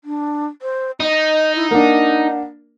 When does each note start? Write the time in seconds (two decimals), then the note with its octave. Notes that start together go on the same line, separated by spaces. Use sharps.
0.04 D4
0.62 C5
1.00 D#4 D#5
1.56 E4
1.71 A#3 D4 F#5